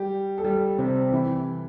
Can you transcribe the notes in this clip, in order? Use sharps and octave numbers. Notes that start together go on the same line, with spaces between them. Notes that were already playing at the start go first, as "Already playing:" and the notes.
Already playing: G3 G4
A4
G3 G4
C3 C4
E3 E4